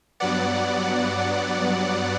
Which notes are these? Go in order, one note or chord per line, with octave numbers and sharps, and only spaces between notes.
G2 F#3 B3 D5 F#5